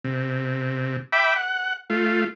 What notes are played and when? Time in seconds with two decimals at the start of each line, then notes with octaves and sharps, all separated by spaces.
0.04 C3
1.13 E5 G5 B5 D6
1.36 F#5
1.90 A3 F4